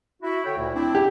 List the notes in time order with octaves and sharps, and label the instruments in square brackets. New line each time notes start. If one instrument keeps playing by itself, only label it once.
[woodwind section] E4 F#4
D3 C#5 G5
D2 A#2 E4
C4 D4 E4
[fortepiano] G4